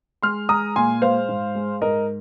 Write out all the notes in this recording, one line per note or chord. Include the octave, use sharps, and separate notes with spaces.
G#3 C6 F6
G#3 A#5 D#6
A#2 G#5 C6
G#3 C5 F5
G#2
G#3
G#2 A#4 D#5